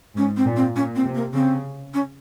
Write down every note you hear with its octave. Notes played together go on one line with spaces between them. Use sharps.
G#2 C#4
C4
A#2
C4
A#2 C#4
C4
C3
A#3
C#3 C4
C#4